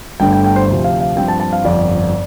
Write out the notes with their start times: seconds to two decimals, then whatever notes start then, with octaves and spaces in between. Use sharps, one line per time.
0.20 G1 G2 D3 A3 G5
0.33 G5
0.44 G5
0.56 C5
0.68 D2 C3 F3 C5
0.84 F5
1.00 F5
1.16 G2 F3 C4 G5
1.28 A5
1.40 A5
1.53 F5
1.64 G1 F2 F3 D5